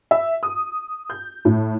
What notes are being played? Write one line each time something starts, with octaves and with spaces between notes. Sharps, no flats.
E5
D#6
G6
A2